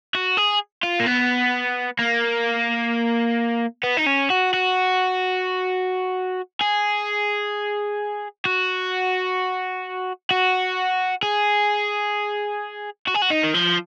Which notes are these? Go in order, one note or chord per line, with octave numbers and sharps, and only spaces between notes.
F#4
G#4
F4
A#3
B3
A#3
B3
D#4
C#4
F#4
F#4
G#4
F#4
F#4
G#4
F#4
G#4
F#4
D#4
D#3
F3